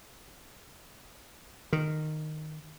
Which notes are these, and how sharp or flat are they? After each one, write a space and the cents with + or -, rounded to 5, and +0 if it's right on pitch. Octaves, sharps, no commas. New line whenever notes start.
D#3 -15